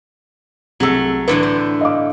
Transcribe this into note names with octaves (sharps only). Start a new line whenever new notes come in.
C2 F#3 A3 G#4 E6
A2 D3 E3 B4
C5
D#5 F5 D6